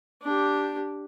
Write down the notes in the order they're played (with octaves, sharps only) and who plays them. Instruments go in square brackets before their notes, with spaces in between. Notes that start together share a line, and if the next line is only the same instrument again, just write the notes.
[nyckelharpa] D4 G4